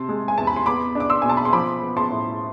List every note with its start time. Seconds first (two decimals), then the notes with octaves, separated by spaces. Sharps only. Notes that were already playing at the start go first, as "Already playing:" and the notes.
Already playing: C3 A5 C6
0.09 G#3
0.28 G#5
0.38 E2 A5
0.47 B5
0.56 C6
0.66 B3 B5 D6
0.95 D4
1.00 D6
1.10 C6 E6
1.22 B2 G#5
1.29 A5
1.37 B5
1.45 C6
1.53 F3 B5 D6
1.82 B3
1.97 A5 C6
2.11 A2